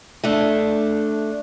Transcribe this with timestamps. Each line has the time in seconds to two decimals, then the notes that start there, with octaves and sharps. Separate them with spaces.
0.24 A3 D4